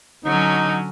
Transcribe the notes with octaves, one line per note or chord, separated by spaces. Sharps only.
D3 F#3 C#4 D#4